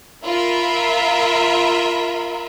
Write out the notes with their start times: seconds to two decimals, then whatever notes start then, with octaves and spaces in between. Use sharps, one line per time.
0.25 F4 A#4 E5 B5